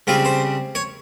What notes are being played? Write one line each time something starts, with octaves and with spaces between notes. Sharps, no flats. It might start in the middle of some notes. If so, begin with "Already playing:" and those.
C#3 G3 C4 F4
C5
C#5